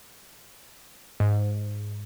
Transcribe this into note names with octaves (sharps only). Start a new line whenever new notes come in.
G#2